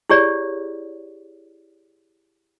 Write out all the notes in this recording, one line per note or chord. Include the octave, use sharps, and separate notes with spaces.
E4 G4 G#4 C#5 D5